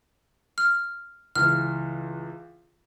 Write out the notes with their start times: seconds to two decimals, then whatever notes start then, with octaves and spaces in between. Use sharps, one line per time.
0.58 F6
1.36 C#2 E3 F6